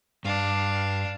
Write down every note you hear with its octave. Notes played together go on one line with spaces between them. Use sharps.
G2 D4 F5